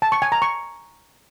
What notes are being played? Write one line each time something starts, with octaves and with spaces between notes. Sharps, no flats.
A5
C#6
G#5
A#5
C#6